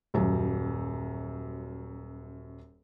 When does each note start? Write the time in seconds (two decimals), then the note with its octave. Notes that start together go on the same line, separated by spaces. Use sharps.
0.14 D#1 F#2 F#3